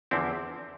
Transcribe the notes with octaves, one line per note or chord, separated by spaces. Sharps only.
E2 D3 F3 C4 E4